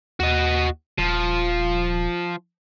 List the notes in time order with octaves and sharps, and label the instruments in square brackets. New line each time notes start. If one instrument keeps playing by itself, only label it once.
[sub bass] D#2 [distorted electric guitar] F#4 D#5
[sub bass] D#1 [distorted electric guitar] F3